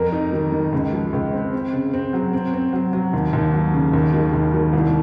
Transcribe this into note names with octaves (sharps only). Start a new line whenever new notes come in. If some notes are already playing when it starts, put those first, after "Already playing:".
Already playing: F2 A#4
D#4
D#3
D#3
C#2
F3
C#2
C4
C4
C#3
C4
F#3
C4
C4
F#3
F#3
D#2
D#2
F#3
C#3
D#2
D#3
D#2
D#3
C2